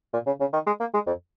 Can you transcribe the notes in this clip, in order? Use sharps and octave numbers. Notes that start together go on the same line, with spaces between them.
A#2
C#3
C#3
D#3
G#3
A#3
G#3
F2